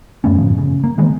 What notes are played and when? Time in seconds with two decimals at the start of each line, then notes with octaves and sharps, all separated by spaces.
0.24 F#2 A3 B3 C#4
0.38 G1 A2 F3
0.58 C#3
0.84 A#3
0.98 D#3 E3 G#3 B3